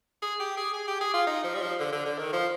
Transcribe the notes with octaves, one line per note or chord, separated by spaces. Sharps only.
G#4
G4
G#4
G#4
G4
G#4
F4
D#4
F3
G3
F3
D3
D3
D3
D#3
F3